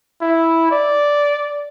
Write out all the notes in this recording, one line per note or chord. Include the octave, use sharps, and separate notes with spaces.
E4
D5